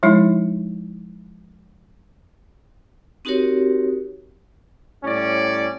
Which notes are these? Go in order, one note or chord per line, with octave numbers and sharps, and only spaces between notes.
F3 G#3 D#4 E4
C4 D#4 F#4 G4 A#4 C#5
A2 G3 C#4 D5